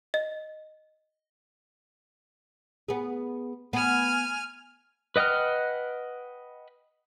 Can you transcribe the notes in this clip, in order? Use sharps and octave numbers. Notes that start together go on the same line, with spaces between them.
D#5
B3 G#4
B3 G#5 F6
B4 D#5 F#5 G5 F6